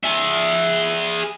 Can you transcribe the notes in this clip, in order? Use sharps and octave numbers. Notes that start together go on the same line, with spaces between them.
G#4 E5